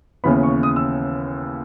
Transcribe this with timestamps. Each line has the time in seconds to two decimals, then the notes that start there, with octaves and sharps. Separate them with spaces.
0.24 D#2 C#3 E3 B3 B5
0.43 C#6
0.63 D#6
0.76 E6